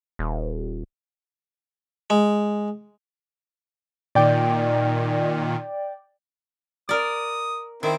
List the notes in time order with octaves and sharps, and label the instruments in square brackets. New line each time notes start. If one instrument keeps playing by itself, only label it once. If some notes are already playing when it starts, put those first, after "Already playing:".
[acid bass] D#1
[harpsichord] G#3
[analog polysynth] A#2 D#3 [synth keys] D5 G5
[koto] A#4 D5 [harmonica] D#6
[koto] D#3 [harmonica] C4 E4